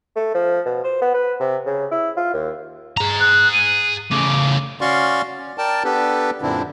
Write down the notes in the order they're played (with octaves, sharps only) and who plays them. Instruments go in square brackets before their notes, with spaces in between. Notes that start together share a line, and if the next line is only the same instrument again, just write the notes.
[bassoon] A3
F3
B2
C5
B3
B4
C3
C#3
E4
F4
D#2
[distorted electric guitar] G#4 A#5
[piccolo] F#6
D#7
[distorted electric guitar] A2 C#3 [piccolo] D6
[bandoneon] C#4 F#4 D5 F5 C6 C#6
C#4
A#4 D5 G5 A5
B3 D4 G4 A4 B4
F#2 A#2 D3 C4 D4 E4